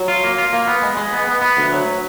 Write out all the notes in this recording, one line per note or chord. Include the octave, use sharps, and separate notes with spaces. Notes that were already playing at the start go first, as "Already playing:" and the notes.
Already playing: F#3
F4
A#3
F4
A#3
B3
G#3
G#3
B3
B3
B3
D2
F#3